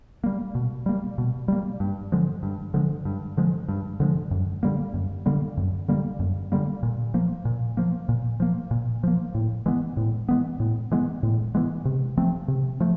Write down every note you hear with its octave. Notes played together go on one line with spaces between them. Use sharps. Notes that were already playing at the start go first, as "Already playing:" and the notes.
G3 A#3
B2
G3 A#3
B2
G3 A#3
G2
D3 F3 G#3
G2
D3 F3 G#3
G2
D3 F3 G#3
G2
D3 F3 G#3
F#2
D3 G3 A#3
F#2
D3 G3 A#3
F#2
D3 G3 A#3
F#2
D3 G3 A#3
A#2
F3 A#3
A#2
F3 A#3
A#2
F3 A#3
A#2
F3 A#3
A2
E3 G#3 B3
A2
E3 G#3 B3
A2
E3 G#3 B3
A2
E3 G#3 B3
C3
F3 A3 C4
C3
F3 A3